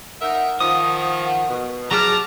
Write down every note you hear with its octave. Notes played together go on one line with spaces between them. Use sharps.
D#4 A#4 E5 F#5
D#3 F3 D#6
B2
F#3 G4 G#4 A5 A#5 F6